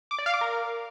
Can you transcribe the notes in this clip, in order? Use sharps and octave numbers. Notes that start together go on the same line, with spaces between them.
D6
D5
F5
D6
A#4